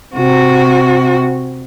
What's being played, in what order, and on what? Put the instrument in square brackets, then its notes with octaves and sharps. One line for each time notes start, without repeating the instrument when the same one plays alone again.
[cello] C3 F#4